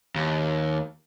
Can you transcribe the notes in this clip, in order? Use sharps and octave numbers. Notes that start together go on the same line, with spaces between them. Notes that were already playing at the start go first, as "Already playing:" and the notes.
D#2